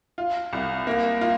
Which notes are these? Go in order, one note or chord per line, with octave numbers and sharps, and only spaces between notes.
F4
C2
A#3
F4